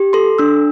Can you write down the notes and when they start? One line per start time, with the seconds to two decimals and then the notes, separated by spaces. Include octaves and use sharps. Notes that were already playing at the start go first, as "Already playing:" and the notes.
Already playing: G4
0.13 A4 C6
0.38 D4 E6